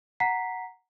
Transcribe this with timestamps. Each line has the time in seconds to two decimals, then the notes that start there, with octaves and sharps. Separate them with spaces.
0.20 F#5 A#5 B6 C7